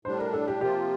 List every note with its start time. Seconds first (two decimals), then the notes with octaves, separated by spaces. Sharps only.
0.05 A2 G3 D4 C5
0.19 A#4
0.33 A4
0.48 G4
0.61 C3 F3 A#3 F4 G4